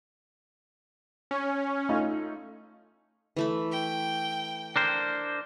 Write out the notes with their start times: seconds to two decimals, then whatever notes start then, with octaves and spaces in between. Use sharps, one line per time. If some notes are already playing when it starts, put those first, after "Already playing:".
1.31 C#4
1.89 A3 D#4 F4
3.36 E3 A3 B5
3.72 G5
4.76 D4 A#4 C5